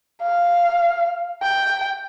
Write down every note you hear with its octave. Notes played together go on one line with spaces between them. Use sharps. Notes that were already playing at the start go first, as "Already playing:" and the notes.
F5
G5